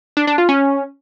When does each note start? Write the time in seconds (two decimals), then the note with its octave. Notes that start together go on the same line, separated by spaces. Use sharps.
0.17 D4
0.27 D4
0.38 F4
0.49 C#4